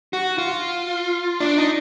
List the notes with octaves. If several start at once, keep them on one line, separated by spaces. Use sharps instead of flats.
F#4
F4
D4
D#4